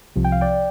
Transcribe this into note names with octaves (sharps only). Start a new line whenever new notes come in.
C2 C3 F3
G5
F5
D5 G5